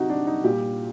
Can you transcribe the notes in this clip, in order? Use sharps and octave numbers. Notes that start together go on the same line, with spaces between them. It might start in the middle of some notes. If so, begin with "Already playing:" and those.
Already playing: C3 D#4 F#4 G4
D4
D#4
A#2 G3 G4